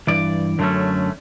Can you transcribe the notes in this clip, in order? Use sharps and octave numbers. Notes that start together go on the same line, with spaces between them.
G2 E3 D5
F#2 D3 F#3 A3 C#4